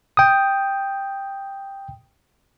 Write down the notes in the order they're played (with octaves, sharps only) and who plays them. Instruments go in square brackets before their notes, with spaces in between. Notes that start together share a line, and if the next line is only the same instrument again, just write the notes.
[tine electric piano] G5 D#6